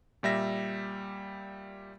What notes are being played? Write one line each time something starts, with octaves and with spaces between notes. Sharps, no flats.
A#2 G3 E5 A#6